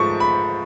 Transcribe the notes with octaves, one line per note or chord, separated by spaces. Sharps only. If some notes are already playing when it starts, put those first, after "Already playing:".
Already playing: G#2 F3 A3 C#6
B5